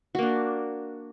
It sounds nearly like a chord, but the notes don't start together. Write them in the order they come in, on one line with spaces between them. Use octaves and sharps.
F#4 A#3 D4